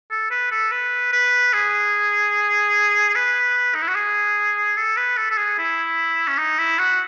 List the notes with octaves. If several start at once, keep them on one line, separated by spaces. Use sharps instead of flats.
A4
B4
A4
B4
B4
G#4
B4
D#4
E4
F#4
G#4
A4
B4
A4
A4
G#4
E4
C#4
D#4
E4
F#4